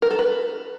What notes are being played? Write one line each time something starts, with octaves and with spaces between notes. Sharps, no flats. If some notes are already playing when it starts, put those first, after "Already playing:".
A#4
A4
B4